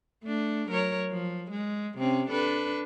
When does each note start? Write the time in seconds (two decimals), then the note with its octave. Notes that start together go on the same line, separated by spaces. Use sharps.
0.24 A3 D4
0.68 F#3 A#4 C#5
1.11 F3
1.51 G#3
1.98 C3 C4 C#4
2.29 D4 A4 B4